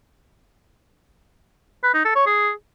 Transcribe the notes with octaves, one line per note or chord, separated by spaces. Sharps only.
B4
D#4
A4
C#5
G#4